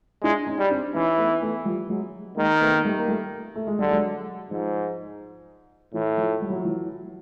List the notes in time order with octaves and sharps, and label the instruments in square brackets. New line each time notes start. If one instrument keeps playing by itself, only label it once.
[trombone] G#3 [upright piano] D4 E4
[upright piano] C#4 D#4
[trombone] G3
[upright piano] C4 D4
[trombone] E3 [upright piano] C#4 D#4
[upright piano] A3 B3
A3 B3
F3 G3
F#3 G#3
[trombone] D#3 [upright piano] G#3 A#3
[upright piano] A3 B3
A#3
G3 A3
A#3
G3 A3
A3
G#3
[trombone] D3 [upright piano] G3
[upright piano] F#3 G#3
[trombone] G#2 [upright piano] F3
[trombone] A2 [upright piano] E3
[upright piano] F3
G3
F#3
F3
E3 F#3